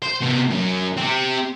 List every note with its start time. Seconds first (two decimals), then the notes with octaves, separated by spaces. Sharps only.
0.02 C5
0.21 C3 B3
0.50 F#2 F#3
0.97 C4 G4